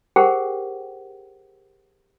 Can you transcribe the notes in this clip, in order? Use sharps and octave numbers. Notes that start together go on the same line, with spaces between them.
G4 G#4 A#4 C5 F#5 G5